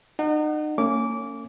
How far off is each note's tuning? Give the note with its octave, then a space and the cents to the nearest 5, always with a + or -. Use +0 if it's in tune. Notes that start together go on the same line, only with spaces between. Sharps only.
D#4 -35 F#5 +10
A#3 -45 C#4 +0 D6 -20